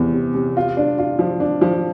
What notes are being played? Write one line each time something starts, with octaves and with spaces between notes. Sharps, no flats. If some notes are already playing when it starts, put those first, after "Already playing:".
Already playing: E2 C3
C3
C3
F4
D4
F4
F3
D4
F3